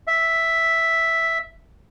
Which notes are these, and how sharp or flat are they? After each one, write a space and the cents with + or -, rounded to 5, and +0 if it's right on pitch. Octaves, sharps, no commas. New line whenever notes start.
E5 +0